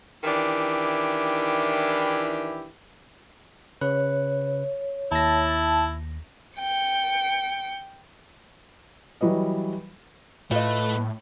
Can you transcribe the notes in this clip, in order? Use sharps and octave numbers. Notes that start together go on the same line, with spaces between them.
D#3 E3 D4 E4 G4
C#3 B4 C#5 F#6
D#2 E4 A5 A#6
G5 C#7
E3 F#3 G3 B4 D#5
A2 A3 F4 B4 D#5